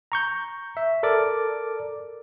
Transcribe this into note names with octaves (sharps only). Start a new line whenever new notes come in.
A#5 C#6 G6
E5
A4 A#4 D5 D6